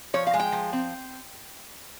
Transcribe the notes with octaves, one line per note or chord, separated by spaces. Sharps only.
F3 C#5
F5
G#3
G5
F3
C4